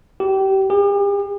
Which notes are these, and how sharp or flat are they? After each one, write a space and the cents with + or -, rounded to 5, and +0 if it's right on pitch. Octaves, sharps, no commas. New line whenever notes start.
G4 -25
G4 +45